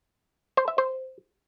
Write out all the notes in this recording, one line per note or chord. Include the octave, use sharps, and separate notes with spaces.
C5
E5
C5